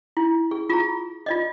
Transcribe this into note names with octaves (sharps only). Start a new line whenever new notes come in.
E4
G#4
F4 G#4 A#5
F4 D5 D#5